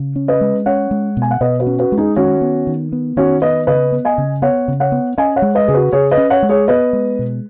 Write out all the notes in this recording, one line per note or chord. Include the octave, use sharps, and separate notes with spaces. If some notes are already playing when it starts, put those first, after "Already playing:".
Already playing: C#3
C#4
B4 D#5
G#3
C#4 C#5 F#5
G#3
B2
G#5
F#5
B2 B4 D#5
F#4 B4
C#4
F#4 B4
G#3
D#4 G#4
D#3 C#4 F#4
B3
D#3
B3
D#3 C#4 F#4
B3 B4 D#5
C#3 B4 D#5
B3
D#5 G#5
C#3
B3 C#5 F#5
C#3
C#5 F#5
B3
C#4 D#5 G#5
C#5 F#5
G#3
B4 D#5
C#3 G#4
F#4 B4
C#3 G#4 C#5
B4 D#5
C#4
C#5 F#5
G#3
G#4 C#5
B3 B4 D#5
G#3
B2